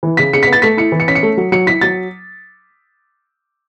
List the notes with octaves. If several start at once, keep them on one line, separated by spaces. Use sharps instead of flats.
E3
C#3 B6
C#3 C#7
B6
B3
A6
A3 B6
E4 C#7
E3
C#7
C#4 B6
C#7
A3
F#3
F#3 C#7
E4 B6
F#3 A6